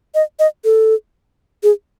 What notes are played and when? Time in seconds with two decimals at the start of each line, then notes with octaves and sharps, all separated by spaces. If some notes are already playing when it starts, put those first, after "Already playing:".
0.15 D#5
0.39 D#5
0.65 A4
1.63 G#4